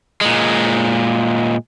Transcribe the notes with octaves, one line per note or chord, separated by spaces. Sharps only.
A#2 G#3